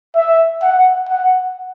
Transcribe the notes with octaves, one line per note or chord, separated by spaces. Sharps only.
E5
F#5
F#5